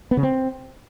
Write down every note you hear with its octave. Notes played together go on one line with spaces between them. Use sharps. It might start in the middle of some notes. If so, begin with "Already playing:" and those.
B3
C#3
C4